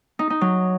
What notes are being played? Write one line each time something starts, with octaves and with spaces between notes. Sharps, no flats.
D#4
D#4
F#3